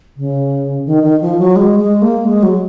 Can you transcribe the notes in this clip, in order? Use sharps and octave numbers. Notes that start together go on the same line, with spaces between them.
C#3
D#3
D#3
F3
F#3
G#3
G#3
A#3
G#3
F#3